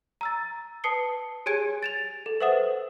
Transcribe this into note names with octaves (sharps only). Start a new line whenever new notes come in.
A#5 E6 A6
B4 A5 D#6 C7 C#7 G7
G4 G#4 C#5 G#5 G#6 D7
A6 E7 F7
A4
B4 C5 E5 F#5 D#6 E7